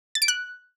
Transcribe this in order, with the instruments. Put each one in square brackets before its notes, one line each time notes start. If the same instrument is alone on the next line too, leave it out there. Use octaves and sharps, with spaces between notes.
[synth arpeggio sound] A6
D7
F#6